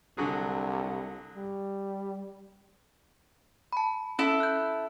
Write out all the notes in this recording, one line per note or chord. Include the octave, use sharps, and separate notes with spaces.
C2 D3 F#3 G#4
G3
A5 B5
C#4 E4 A4
F#6 G6